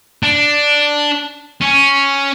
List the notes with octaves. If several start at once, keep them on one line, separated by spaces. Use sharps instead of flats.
D4
C#4